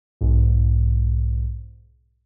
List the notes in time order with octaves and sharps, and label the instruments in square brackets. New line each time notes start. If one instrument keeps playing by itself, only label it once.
[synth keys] B1 G#2